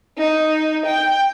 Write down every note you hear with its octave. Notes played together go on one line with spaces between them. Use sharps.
D#4
G5